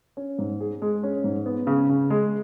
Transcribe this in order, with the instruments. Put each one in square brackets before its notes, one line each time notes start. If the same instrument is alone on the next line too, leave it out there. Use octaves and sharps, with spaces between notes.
[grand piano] C#4
G#2
G#4
G#3
C#4
G#2
B3
C#3
C#3
G#3